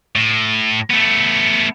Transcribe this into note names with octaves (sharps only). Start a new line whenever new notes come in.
A2
A3 B3